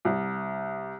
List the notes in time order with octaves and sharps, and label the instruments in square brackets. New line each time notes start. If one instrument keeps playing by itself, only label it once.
[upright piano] C2